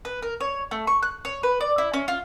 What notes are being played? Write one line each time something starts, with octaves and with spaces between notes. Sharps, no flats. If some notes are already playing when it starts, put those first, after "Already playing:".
B4
A#4
C#5
A3
C#6
F#6
C#5
B4
D5
E4
C#4
F4